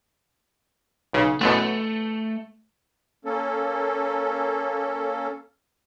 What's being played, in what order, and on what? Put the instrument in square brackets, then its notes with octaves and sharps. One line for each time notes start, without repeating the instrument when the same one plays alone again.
[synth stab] B1 C#3
[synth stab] A1 F#2 B2 [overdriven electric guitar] A3
[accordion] A#3 C#4 A4